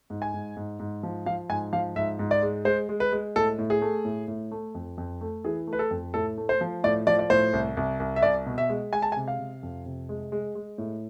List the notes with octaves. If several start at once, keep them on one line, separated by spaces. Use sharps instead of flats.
G#2
G#5
G#2
G#2
G#2
F3
F3 F5
G#2 G#5
F3 F5
G#2 E5
G#2
D5
G#3
G#3 C5
G#3
B4
G#3
A2 A4
A2
G#4
A3
A2
A2
A3
F2
F2
A3
E3 G#4
A3
B4
A4
F2
A2 A4
A3
C5
F3
A2 D5
F3 D5
D5
A2 C5
C2
C2
C2
E5
C2 D5
B2
E5
G#3
G#3 G#5
A5
G#5
C3
F5
C3
F2
C3
G#3
G#3
G#3
A2